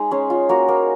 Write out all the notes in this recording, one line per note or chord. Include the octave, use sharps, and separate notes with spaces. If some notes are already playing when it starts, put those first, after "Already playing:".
Already playing: G#3 D#4
C#4 G#4 C5
F4
A#3 F#4 A#4
A#3